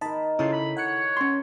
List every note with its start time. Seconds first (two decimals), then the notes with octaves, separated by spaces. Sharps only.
0.01 D#3 A#4 D#5 A5 B5
0.39 C#3 E4 F4 G#4 A4 C#5
0.53 B5
0.77 C#5 F#5 F#6 C#7
1.17 C#4 C6